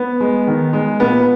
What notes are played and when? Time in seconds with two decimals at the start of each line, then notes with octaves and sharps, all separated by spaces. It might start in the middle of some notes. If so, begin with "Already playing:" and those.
Already playing: B3
0.20 G#3
0.47 D#3
0.73 G#3
1.00 A#2 B3